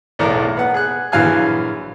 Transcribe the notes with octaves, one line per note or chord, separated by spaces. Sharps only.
B1 E2 A2 A#4 D5
B3 F#5
G#4 F#6
A#1 E3 F#3 F5 G#5 F#6